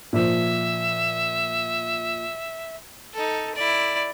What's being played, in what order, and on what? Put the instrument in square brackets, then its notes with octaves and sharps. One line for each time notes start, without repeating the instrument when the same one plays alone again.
[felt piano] A#2 F3 [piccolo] E5
[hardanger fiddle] D#4 A4
E4 D5